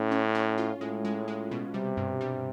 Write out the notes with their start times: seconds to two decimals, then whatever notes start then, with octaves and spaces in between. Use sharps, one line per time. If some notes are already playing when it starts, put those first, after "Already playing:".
Already playing: A2 C#4
0.11 C#4
0.35 C#4
0.58 F4
0.81 A2 G#3
1.05 G#3
1.28 G#3
1.51 B2
1.74 C3 G3
1.97 G2
2.21 G3